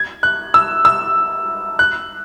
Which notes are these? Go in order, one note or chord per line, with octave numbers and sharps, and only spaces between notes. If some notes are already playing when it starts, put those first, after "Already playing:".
Already playing: G#6
F#6
E6
E6
F#6